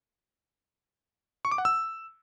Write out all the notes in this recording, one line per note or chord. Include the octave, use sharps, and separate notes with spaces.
C#6
D6
F#5
E6